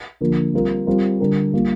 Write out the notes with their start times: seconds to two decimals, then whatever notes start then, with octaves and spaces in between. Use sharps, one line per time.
0.21 D3 F3 A#3 F4 A#4
0.54 G3 C4 F4 A#4
0.87 G3 C4 F4 A#4
1.20 D3 G3 D4 G4 A#4
1.54 G3 A#3 F4